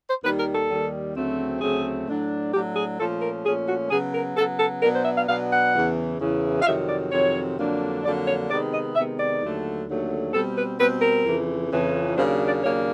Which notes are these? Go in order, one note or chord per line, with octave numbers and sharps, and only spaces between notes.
C5
D#2 D#3 G3 B4
A#4
A4
D#2 D#3 G3
D2 C#3 F#3 A3 C4
D2 C#3 F#3 A3 C4 G#4
A2 F#3 A3 D4
A2 F#3 A3 D4 G4
G#4
A#2 F3 A3 C#4 A4
A#4
A#2 F3 A3 C#4 G#4
F#4
C#3 F#3 B3 G#4
A#4
C#3 F#3 B3 A4
A4
B2 F#3 B3 D4 A#4
C5
E5
F5
B2 F#3 B3 D4 F5
F#5
E2 C#3 E3
E2 C#3 E3
F5
F2 C3 D#3 F#3 E5
D5
F2 C3 D#3 F#3 C#5
F2 D3 F#3 A#3 D4
F2 D3 F#3 A#3 D4 D5
C#5
C3 D#3 G#3 B3 D5
D#5
C3 D#3 G#3 B3 E5
D5
D#2 D3 F#3 A3
D#2 D3 F#3 A3
B2 G3 C4 A4
B4
B2 G3 C4 B4
A#4
F2 C#3 E3
F2 C#3 E3
D#2 C#3 F#3 A#3 D4 C5
D5
D#2 C#3 F#3 A#3 D4 C#5